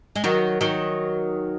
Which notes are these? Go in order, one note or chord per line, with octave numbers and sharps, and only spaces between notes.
G#3
D#3 F#3
D#3 F#3